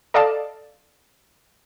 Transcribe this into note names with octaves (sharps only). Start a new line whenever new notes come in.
A4 D5 D#5 F5 A5